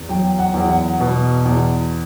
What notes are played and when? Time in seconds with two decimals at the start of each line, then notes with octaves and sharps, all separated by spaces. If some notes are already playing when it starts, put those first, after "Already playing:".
Already playing: E2
0.09 F#3 G5
0.39 F#5
0.54 E2
0.70 F#5
1.00 B2
1.45 E2